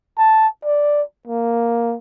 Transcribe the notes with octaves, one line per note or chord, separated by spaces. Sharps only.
A5
D5
A#3